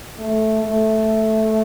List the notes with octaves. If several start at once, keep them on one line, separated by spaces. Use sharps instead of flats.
A3
A3